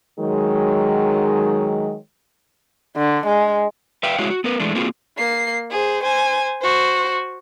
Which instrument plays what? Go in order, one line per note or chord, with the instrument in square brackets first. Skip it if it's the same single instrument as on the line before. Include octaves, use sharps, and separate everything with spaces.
[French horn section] D#3 F#3 G#3
[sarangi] D3
G#3
[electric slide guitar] B4 E5 F5 G5
G#3 E4 F#4 C#5 F5
F#4
B3 A#4 B4
E3 G#3 A3 D4
A#3 C4 F4 F#4 G#4
[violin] A#3 C7
G#4 C5
C5 G#5
F#4 C5